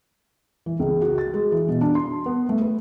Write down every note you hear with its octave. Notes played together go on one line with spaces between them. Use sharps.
E3
C#2
F#4
A6
G#3
E3
B2
D4
C6
B3
A3
B4